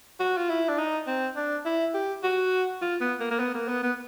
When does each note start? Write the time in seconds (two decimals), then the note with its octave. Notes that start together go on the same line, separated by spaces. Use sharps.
0.20 F#4
0.37 F4
0.50 E4
0.68 D4
0.79 D#4
1.07 C4
1.36 D4
1.65 E4
1.94 G4
2.24 F#4
2.82 F4
3.01 B3
3.20 A#3
3.31 A#3
3.40 B3
3.55 A#3
3.68 B3
3.83 B3